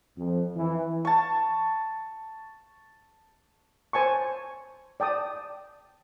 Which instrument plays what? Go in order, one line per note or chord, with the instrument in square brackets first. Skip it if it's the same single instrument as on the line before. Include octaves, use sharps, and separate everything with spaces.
[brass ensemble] F2
E3
[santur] A5 C#6
[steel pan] C5 G#5 A5 C#6
D5 G5 A5 D#6